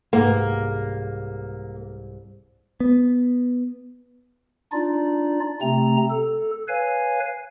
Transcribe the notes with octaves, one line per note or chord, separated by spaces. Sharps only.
C2 G#2 A#3 C#7
B3
D4 D#4 F4 D5
C3 A3 C4 A#5
A4
B4 C#5 F5 G#5